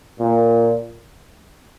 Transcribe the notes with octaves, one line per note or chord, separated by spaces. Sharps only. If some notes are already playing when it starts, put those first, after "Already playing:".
A#2